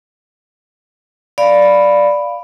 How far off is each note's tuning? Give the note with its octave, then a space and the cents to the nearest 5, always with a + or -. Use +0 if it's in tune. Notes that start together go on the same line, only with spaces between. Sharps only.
D5 +0 F5 +0 B5 +0